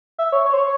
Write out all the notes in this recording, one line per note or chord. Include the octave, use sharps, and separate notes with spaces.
E5
C#5
C#5
C5
C#5